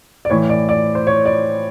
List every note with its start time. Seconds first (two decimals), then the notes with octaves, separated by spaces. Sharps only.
0.25 D5
0.30 A2 E3 C#5
0.49 D5
0.69 D5
0.95 C5
1.07 C#5
1.25 D5